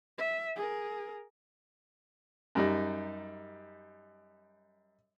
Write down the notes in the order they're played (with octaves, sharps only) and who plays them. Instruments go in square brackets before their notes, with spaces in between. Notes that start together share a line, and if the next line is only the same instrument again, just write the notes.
[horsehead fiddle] E5
G#4 A#4
[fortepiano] F#2 G3 D#4